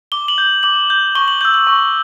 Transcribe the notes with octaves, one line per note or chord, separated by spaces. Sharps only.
D6 G7
F#7
G6
D6 F#7
G6
C#6 G7
F#7
E6 G6 F#7
F#7
C#6